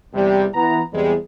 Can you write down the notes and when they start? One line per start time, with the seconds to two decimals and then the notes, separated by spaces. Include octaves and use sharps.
0.14 E2 C3 G3
0.54 E3 B3 A#5
0.93 E2 C3 G3 G#3